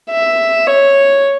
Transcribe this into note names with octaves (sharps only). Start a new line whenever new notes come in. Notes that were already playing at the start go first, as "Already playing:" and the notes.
E5
C#5